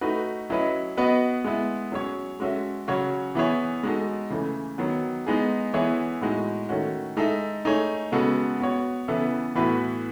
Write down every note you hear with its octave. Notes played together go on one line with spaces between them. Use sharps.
A3 D#4 F#4 B4
F#3 C#4 E4 B4 D#5
B3 F#4 B4 D#5
G#3 B3 E4
F#3 C#4 G#4 C#5
G#3 C#4 F#4 A4 E5
C#3 F#3 C#4 F#4 C#5
E3 B3 E4 G#4 C#5
G#3 D#4 F#4 A4
C#3 E3 A3
D#3 F#3 B3
G#3 B3 D#4 G#4
E3 B3 E4 G#4 C#5
A2 G#3 D#4 F#4
D#3 A3 C#4 F#4
G#3 D#4 A4 E5
A3 D#4 G#4 C#5
C#3 G#3 B3 F#4 A4
B3 F#4 C#5
C#3 E3 B3 E4 A4
A2 E3 B3 F#4 B4